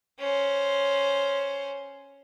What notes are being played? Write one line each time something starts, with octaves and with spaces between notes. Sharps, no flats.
C#4 C5